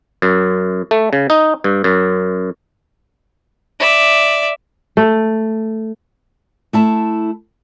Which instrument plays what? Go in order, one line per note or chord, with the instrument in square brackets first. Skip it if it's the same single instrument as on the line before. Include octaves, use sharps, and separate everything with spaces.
[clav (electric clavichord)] F#2
A3
C#3
D#4
G2
F#2
[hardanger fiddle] D5 E5
[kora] A3
[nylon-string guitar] A3 E4 A5